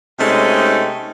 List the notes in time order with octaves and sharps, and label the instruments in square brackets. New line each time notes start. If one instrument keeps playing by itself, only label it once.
[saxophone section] C3 G#3 A3 C4 C#4 D#4